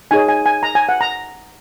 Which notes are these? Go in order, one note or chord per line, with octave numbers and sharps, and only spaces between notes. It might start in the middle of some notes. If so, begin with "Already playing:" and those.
D#4 G#4 C#5 G#5
G#5
G#5
A#5
G#5
F#5
A#5